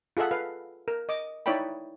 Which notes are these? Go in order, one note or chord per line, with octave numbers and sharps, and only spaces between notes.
F4 G#4 A4 E5 F#5
B4 F5
A#4
D#5 D6
D#4 E4 C#5 D5 G5 B5